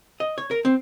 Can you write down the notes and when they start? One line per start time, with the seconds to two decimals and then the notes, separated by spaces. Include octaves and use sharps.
0.20 D#5
0.38 C#5
0.51 A#4
0.65 C4